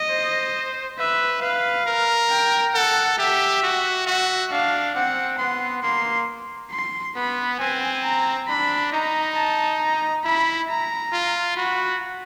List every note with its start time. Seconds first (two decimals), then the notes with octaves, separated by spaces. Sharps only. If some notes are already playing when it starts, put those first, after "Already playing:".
Already playing: D#5
0.10 C5
0.98 B4 E5
1.42 B4 F5
1.86 A#4
2.30 G5
2.74 A4 F#5
3.18 G4 E5
3.63 F#4
4.07 F#4 E5
4.51 D4 F5
4.95 C4 F#5
5.39 B3 C6
5.83 A#3 C6
6.72 C6
7.15 B3 B5
7.59 C4 G#5
8.04 A#5
8.48 D4 B5
8.92 D#4 A#5
9.35 A5
9.80 A#5
10.24 E4 B5
10.69 A#5
11.12 F4
11.57 F#4 B5